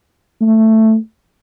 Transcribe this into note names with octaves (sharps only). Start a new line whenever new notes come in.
A3